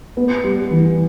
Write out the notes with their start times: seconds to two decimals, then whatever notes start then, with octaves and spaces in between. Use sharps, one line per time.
0.17 B3
0.44 G3
0.71 E3